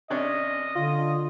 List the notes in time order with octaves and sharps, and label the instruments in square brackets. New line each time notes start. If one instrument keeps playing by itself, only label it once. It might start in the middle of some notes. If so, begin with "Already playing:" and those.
[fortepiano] C3 C#4 D4 [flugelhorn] D#5
[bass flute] D3 [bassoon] F4